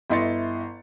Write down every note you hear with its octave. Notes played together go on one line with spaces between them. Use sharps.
G1 E4 D#5 C6 A6 C#7